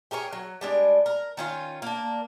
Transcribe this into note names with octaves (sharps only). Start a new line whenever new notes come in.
G4 G#4 A#4 C#5
F#3
G3 G#3 D4
A#4
D#3 C#4 F4
A#3 D4